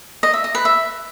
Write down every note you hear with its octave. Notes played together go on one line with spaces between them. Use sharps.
D#5
E5
D#5
B4
E5